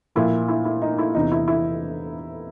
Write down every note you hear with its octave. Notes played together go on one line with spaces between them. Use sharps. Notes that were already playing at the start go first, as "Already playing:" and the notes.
A#2 F3 E4
E4
E4
D#4
E4
E2 C3 E3 D#4
E4
E4